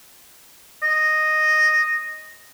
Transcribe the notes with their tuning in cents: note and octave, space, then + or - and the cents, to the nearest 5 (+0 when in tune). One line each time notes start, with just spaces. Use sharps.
D#5 -5